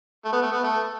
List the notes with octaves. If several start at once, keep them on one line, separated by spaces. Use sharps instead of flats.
A3
B3
A3
B3
A3